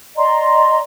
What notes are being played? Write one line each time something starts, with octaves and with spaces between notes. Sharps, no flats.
D5 D#5 A#5 C6